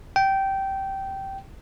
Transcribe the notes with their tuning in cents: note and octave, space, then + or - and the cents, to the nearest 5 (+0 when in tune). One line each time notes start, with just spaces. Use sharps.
G5 -15